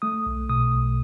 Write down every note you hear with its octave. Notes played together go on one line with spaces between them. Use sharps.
A3 D#6
B1
B2 D#6
B1